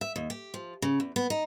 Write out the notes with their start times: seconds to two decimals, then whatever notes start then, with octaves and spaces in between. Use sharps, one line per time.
0.01 E5
0.16 D#2
0.30 G4
0.54 F3
0.82 C#3
1.00 E2
1.16 B3
1.30 D#4